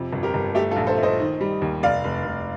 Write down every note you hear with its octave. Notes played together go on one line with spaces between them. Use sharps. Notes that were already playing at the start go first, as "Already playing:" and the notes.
Already playing: F2 C3
G1
G4 A#4
G1
A3 G4
F4 A4
A#1
A4 C5
A3
C5 D#5
D#3
G3
D#2
F1 D5 F5
F1
F1